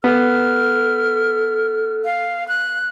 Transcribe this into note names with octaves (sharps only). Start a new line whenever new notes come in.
B3 A4 F6
F5
F#6